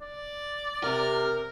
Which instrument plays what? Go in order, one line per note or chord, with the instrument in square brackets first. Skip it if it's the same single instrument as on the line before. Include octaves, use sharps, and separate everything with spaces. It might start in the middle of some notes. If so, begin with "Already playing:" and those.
[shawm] D5
[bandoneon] C3 F6 [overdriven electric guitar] A#4